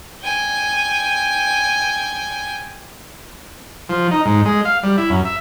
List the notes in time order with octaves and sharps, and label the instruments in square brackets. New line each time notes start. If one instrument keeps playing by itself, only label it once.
[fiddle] G5 G#5
[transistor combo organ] F3
D#4
G#2
G#3
F5
G3
E4
F#2
E5